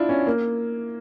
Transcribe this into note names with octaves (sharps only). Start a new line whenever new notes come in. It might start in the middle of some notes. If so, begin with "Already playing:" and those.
Already playing: D4 E4 F4
C#4
A#3